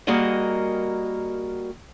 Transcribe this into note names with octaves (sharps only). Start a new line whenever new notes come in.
G3 A#3 F#4 G#4 A#4 D#5